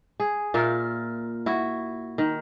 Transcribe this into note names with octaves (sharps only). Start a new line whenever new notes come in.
G#4
A#2 F4 A#4 E5
E4 F#4
D#3